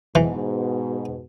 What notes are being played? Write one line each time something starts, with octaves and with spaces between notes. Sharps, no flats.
G#2 B2 E3